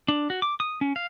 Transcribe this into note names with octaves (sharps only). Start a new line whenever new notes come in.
D4
F#4
D6
D#6
C#4
F5